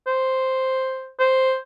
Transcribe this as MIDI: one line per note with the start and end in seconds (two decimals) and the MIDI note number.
0.07 1.10 72
1.19 1.56 72